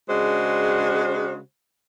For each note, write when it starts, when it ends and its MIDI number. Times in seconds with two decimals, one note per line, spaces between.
0.09 1.39 49
0.09 1.39 56
0.09 1.39 62
0.09 1.39 66
0.09 1.39 72